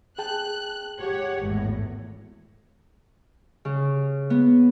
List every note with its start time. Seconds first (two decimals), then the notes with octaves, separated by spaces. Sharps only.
0.18 G#4 G5 A5 F#6
1.00 G4 C#5 F#5
1.40 G#1 E2 A2
3.65 C#3
4.30 B3